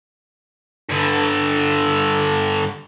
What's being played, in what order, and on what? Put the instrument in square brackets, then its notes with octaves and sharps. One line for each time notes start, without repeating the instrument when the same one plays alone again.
[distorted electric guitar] G2 D3